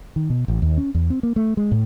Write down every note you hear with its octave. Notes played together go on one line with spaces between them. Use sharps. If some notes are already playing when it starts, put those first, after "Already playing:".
D#3
B2
A1
D#2
C#4
E2
C4
A#3
A3
G#3
A2